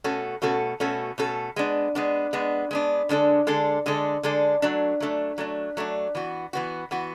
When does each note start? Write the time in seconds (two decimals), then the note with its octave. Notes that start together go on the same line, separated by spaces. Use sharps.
0.04 B2 A3 C#4 F#4 A4
0.42 B2 A3 C#4 F#4 A4
0.80 B2 A3 C#4 F#4 A4
1.18 B2 A3 C#4 F#4 A4
1.56 G#3 B3 D4
1.95 G#3 B3 D4
2.33 G#3 B3 D4
2.71 G#3 B3 D4
3.09 D3 G#3 D4 A4
3.47 D3 G#3 D4 A4
3.86 D3 G#3 D4 A4
4.23 D3 G#3 D4 A4
4.62 F#3 A3 D4
5.00 F#3 A3 D4
5.38 F#3 A3 D4
5.77 F#3 A3 D4
6.15 E3 B3 F#4
6.53 E3 B3 F#4
6.91 E3 B3 F#4